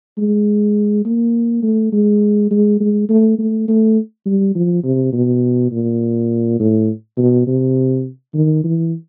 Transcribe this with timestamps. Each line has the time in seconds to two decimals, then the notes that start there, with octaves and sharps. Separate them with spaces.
0.18 G#3
1.05 A#3
1.63 A3
1.92 G#3
2.51 G#3
2.80 G#3
3.09 A3
3.39 A3
3.68 A3
4.26 G3
4.55 F3
4.84 C3
5.13 B2
5.72 A#2
6.60 A2
7.17 B2
7.47 C3
8.34 D#3
8.64 E3